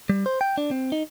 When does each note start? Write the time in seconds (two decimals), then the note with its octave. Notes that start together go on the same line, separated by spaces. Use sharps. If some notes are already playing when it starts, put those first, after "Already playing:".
0.10 G3
0.26 C5
0.41 G5
0.58 D4
0.71 C4
0.92 D#4